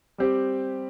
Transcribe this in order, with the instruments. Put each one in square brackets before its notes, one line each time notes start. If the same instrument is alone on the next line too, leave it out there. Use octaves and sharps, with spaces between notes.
[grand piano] G3 C4 G4